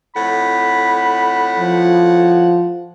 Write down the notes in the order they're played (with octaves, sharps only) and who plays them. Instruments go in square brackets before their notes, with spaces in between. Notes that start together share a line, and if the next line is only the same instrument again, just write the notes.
[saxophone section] F2 A2 F#5 [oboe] B5
[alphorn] F3